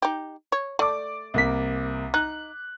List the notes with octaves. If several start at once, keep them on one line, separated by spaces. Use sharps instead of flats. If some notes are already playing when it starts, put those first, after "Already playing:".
D#4 G4
C#5
A3 D5 D6
C2 A#3 B6
D#4 F#6